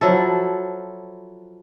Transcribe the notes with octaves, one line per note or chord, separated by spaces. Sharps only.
F3 F#3 E4 A4